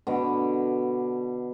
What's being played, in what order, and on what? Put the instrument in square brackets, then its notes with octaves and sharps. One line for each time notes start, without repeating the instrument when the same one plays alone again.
[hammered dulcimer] B2 D3